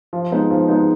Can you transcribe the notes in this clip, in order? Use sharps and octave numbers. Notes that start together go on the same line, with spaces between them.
F3
G#3 B3 D#4
F3
G#3 B3 D#4